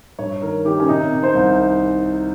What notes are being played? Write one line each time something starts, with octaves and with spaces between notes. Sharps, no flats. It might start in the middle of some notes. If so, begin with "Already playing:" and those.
G2 C#5
D#3 A#4
D#3 G4
C#4
C3 D#4
C3
C5
C2